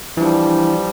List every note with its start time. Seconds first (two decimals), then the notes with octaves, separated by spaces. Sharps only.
0.17 E3 F3 G3 D4